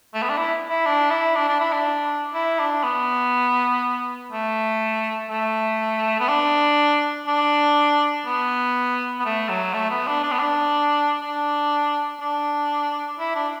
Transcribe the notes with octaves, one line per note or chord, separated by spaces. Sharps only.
A3
B3
D4
E4
E4
D4
E4
D4
D4
E4
D4
E4
D4
B3
A3
A3
B3
D4
D4
B3
B3
A3
F#3
A3
B3
D4
D4
B3
D4
D4
D4
E4
D4